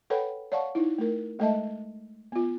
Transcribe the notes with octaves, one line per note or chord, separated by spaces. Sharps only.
A4 B4 C#5 F#5 G5 B5
C#5 D5 F5 F#5 A5 C#6
D#4 E4
A3 A#4
G#3 A3 A4 D#5 E5 A5
B3 F4